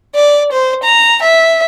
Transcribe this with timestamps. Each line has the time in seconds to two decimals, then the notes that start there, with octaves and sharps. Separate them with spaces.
0.15 D5
0.52 C5
0.83 A#5
1.22 E5